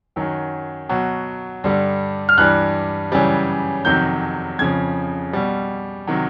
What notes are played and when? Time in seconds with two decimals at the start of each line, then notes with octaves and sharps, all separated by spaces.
0.16 F#2 D#3 F#3
0.89 B2 F#3
1.64 G2 D3 G3
2.29 F6
2.38 G2 E3 G3 F#6
3.12 F#2 C#3 E3 G3
3.85 F2 C3 D#3 F#3 G6
4.59 F2 C#3 F3 G#6
5.33 B2 G3
6.07 C3 D#3 F#3